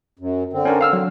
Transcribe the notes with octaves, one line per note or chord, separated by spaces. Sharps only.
F#2
D3 C4
C#4 D4 A#4
F5 E6 F6
F#3